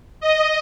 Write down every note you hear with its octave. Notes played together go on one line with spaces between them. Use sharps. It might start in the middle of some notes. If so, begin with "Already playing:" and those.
D#5